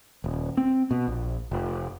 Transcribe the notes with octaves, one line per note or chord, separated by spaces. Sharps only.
D#1
C4
B2
A#1
F1